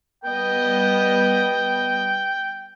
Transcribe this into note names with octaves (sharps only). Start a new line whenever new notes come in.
G3 B3 D#5 G5